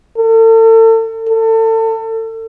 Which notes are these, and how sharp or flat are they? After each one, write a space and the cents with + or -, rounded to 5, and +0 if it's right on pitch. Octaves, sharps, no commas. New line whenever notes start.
A4 +40
A4 +30